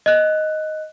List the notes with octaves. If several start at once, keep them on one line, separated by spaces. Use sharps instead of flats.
D#5 F#6